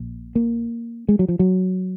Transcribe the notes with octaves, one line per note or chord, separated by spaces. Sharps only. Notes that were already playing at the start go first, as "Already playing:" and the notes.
Already playing: A#1 A#2
A#3
G#3
F#3
F3
F#3